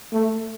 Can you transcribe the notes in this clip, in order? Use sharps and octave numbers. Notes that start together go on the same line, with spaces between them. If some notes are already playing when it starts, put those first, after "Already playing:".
A3